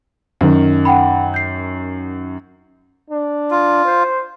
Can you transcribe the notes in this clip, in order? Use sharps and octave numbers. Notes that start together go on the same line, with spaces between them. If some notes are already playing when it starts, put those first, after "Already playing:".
F#2 D#3
F#5 G5 B5
G6 C7
D4
F4
C5